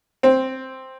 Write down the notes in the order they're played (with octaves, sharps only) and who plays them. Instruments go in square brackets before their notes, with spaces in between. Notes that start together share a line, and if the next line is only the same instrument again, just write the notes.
[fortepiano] C4